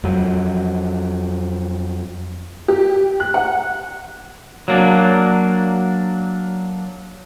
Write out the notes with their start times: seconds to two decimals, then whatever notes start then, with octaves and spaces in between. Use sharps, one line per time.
0.04 F2 F#3
2.68 G4
3.20 F#6
3.34 F#5
4.68 F#3 A#3 D4